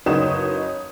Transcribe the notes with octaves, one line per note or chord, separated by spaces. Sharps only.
F#1 D#4 B4 C#5 D#6 E7